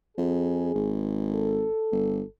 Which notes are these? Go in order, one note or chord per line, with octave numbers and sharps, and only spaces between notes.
F2 G#4
G#1
A4
G1